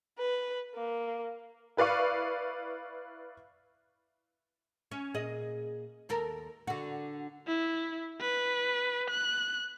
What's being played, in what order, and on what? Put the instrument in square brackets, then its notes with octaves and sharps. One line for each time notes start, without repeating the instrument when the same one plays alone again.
[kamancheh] B4
A#3
[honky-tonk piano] E4 B4 D5 F5 C#6
[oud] C#4
A#2 G#4 D#5
D#2 A4 A#4
D3 F#4
[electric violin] E4
B4
F#6